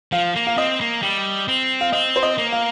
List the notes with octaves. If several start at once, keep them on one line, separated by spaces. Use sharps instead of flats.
F3 F5
A#3
F5
C4 D#5
A#3
G3
C4
F5
C4 D#5
C5
D#5
A#3
F5